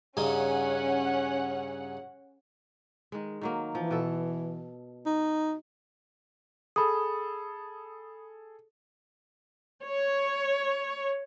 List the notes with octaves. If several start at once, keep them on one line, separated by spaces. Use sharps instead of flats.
G2 C#3 C#4 D#4 F#5
D#3 G#3
D#3 F#3 A#3
E3 F3
B2 A4
D#4
G#4 A4 B5 D#6
C#5